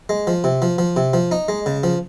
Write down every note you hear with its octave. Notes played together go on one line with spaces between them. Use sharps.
G#3
F3
C3
F3
F3
C3
F3
D#4
G#3
C#3
F3